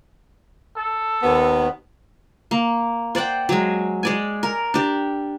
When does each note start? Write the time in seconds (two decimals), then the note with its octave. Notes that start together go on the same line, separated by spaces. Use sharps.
0.77 A4
1.23 D#2 B3
2.51 A#3
3.15 C5 D5 F#5 G5
3.49 F#3 G#3
4.03 G#3 D5 G#5
4.43 A#4
4.74 D4 G4